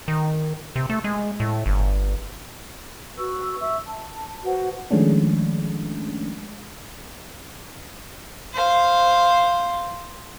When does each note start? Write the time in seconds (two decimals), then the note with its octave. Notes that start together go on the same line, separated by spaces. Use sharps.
0.08 D#3
0.76 C3
0.90 A3
1.04 G#3
1.40 A2
1.66 G1
3.18 F#4 B4 C#6 E6
3.60 E5 C#6 E6
3.88 A5
4.45 F#4 B4 C5 F#5
4.91 D#3 F3 G#3 A3 C#4 D4
8.54 C5 F5